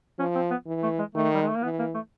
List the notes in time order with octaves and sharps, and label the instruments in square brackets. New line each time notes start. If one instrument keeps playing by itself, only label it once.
[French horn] F3 [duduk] C#4
[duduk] C4
B3
[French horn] E3
[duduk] A3
G#3
[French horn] D#3 [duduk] A3
[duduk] G3
G#3
A3
A#3
[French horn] E3 [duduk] B3
[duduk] A#3
A3